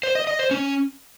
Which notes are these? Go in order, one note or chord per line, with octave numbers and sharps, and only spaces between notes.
C5
D#5
D#5
C5
C#4